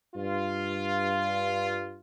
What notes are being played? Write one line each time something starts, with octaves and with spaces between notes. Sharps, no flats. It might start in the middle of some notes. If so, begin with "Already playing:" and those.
G2 F4